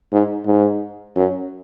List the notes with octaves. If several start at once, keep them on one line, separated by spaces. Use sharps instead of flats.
G#2
G#2
F#2